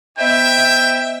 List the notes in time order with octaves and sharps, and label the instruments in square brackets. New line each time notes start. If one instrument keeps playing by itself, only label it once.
[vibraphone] B3 C5 D#5 [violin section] E5 [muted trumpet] G5